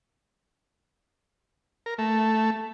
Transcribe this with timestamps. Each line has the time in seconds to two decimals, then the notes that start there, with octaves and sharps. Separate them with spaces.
1.86 A#4
1.98 A3